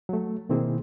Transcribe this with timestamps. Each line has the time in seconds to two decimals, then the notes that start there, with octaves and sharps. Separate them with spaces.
0.09 F#3 A3
0.49 B2 D#3 A#3 C4 E4 G#4